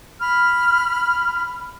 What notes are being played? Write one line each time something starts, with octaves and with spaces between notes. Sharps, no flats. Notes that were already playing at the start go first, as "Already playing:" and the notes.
B5 F6